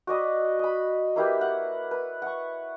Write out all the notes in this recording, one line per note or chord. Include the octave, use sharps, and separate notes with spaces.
F#4 D5 D#5 B5
D#5 B5
A#3 E4 G4 B4
F#5
B4
F#5 C#6